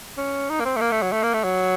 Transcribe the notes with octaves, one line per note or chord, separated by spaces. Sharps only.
C#4
D#4
A#3
C4
A3
A#3
A3
F#3
A3
A#3
A3
F#3